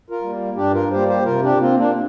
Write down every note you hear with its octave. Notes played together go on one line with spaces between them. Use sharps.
F4 A#4
G3 A#3
G2 D4 G4
F4 A#4
G3 A#3 G4 C5
G4 C5
C3 F4 A#4
D4 G4
A#3 C4 F4
A#3 D4